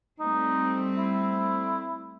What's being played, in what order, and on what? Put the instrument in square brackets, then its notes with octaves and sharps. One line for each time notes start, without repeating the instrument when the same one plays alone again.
[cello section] G3 A3 C4 [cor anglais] D#4
[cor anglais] E4